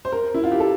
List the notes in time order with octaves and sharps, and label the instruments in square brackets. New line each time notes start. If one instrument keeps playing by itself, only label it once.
[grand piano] C5
A#4
E4
F4
G4
A4